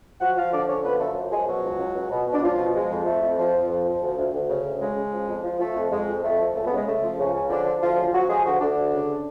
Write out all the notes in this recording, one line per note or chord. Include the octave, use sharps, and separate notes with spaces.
F3 F#4 F#5
F3 F4 F5
D3 D4 D5
D3 C#4 C#5
F3 B3 B4
F#2 A3 A4
F#2
F3 G#3 G#4
B2 F#3 F#4
C#2
C#2
C#2
B2
B2
D4
C#2 F3 F4
B2
F3 G#3
F2
F2 A3
F2
F3
F2
F3
F3
D2
D2
D2
C#3
D2
C#3 G#3
C#3
F3
F2
F3
F3 A3
F2
F2 G#3
F2
F2 A3
F3
C#2 A3
B2 B3
C#3
G#3
C#3 A3
F3
C#2 C#3 C#4
C#3
D3 F3 D4
F3
D2 F3 F4
C#3
F3 F#3 F#4
F3 G#3 G#4
D2 F#3 F#4
D2 D3 D4
D2
C#3